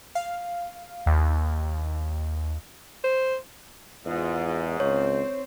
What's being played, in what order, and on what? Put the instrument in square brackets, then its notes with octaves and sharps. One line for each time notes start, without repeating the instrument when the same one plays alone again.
[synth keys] F5
D#2
[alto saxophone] C5
[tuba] E2 [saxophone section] G#2 [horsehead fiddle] F4
[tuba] C#2 [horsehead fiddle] C4 C5 [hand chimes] C#5